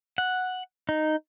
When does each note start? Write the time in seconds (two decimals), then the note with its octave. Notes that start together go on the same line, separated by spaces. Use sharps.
0.18 F#5
0.89 D#4